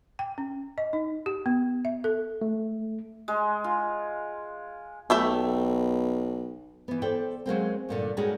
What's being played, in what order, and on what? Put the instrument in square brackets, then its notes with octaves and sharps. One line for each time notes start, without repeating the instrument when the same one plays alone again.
[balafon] G5
C#4
D#5
D#4
G4
B3
E5
A4
[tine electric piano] A3
[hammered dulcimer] G#3
F4
[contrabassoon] B1 [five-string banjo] A3 G4 E5
[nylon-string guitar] E3 B3
A4 C5 D5 E5 G5
F#3 G#3 A#3 C4
G2 A#2 D3
G3 G#3 C#4 D#4 F#4 G#4